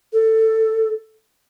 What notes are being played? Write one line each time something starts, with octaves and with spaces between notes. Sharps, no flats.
A4